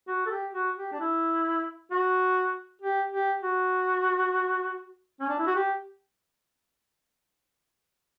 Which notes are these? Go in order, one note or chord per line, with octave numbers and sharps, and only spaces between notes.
F#4
A4
G4
F#4
G4
D4
E4
F#4
G4
G4
F#4
C#4
D4
E4
F#4
G4